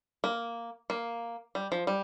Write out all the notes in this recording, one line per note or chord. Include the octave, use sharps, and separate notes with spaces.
A#3
A#3
G3
F3
G3